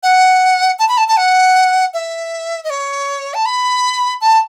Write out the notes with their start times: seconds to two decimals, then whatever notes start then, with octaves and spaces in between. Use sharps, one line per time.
0.03 F#5
0.79 A5
0.88 B5
0.97 A5
1.08 A5
1.17 F#5
1.94 E5
2.64 D#5
2.70 C#5
3.34 A5
3.45 B5
4.21 A5